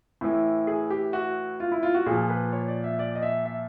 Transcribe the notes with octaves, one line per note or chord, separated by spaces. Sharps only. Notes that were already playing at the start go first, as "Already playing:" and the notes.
A2 E3
G#4
G4
F#4
F4
E4
F4
F#4
A#2 F3 G#4
B4
C#5
D5
E5
D5
D#5
E5
E5